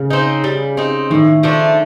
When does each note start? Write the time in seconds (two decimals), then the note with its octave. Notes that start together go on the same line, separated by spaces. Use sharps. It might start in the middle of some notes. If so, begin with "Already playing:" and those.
Already playing: C#3
0.11 C4 D#4
0.44 G3
0.77 C4 D#4
1.10 A2 D#3
1.43 F3 A3 D4